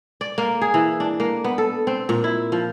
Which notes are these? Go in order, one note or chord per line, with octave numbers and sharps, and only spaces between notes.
D5
A#3
G#4
E3
D4
A#3
B3
A4
C4
A#2
E4
F3